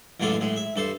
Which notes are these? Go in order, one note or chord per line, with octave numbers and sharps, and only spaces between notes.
A1 F#2 G#3 D4 F4 A4
A2 G#3
E5
G2 A4 C5